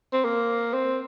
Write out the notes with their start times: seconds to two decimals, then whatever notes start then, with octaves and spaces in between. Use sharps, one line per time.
0.13 C4
0.25 A#3
0.74 C4